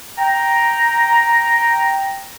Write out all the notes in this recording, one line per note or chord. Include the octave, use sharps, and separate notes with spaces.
G5 A#5